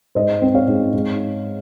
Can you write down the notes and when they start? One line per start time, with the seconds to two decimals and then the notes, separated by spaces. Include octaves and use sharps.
0.15 G#2 C5 D#5
0.42 C4
0.55 C#5 F5
0.68 G#2
0.93 G#2